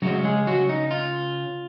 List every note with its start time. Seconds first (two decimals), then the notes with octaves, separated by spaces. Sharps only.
0.02 C#3 F#3 G#3 C#4 F#4
0.24 G#3 G#4
0.47 F#3 F#4
0.69 D#4
0.91 F4